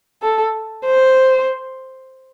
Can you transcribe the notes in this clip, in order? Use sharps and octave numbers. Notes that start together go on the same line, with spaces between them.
A4
C5